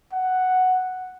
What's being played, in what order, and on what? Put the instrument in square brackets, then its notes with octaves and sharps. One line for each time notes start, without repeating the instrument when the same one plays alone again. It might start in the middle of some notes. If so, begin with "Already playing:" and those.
[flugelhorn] F#5